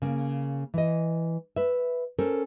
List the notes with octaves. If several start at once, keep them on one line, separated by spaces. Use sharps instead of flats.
C#3 A#3
E3 D#5
B4 E5
C#4 A4 A#4 C5